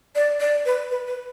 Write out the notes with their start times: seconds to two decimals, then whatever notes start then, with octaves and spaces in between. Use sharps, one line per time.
0.15 D5
0.40 D5
0.66 B4
0.91 B4
1.07 B4